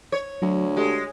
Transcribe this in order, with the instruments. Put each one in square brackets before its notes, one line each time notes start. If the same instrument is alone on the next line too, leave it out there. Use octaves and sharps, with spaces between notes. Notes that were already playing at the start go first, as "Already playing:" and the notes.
[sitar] C#5
[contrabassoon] D2 [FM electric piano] F#3
[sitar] G#3 [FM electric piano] G4 A4